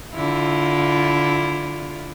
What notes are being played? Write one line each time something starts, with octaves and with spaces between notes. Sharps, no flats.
D3 E4 F4